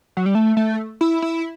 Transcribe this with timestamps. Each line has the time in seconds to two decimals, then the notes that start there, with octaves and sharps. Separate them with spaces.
0.17 F#3
0.26 G3
0.35 A3
0.57 A3
1.01 E4
1.22 E4